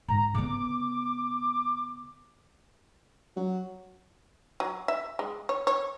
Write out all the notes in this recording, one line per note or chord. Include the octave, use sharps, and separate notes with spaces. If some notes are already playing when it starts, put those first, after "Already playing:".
G#2 A#5
C#3 B3 D6
F#3
F#3
E5
G#3
C#5
C#5